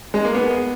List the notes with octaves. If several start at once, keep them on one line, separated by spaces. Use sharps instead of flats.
G#3
A#3
B3